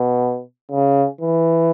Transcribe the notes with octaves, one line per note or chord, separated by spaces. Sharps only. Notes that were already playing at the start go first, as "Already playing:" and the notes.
Already playing: B2
C#3
E3